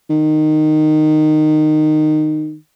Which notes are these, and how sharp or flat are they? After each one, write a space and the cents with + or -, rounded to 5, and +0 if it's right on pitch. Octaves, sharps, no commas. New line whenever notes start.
D#3 -15